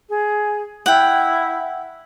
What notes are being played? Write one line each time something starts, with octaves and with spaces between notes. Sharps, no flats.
G#4
E4 F#5 G5